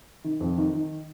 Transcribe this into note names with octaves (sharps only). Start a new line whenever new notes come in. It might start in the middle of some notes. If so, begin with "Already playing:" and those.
D#3
F2
D#3
D#3